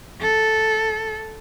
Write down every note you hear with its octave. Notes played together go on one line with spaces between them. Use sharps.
A4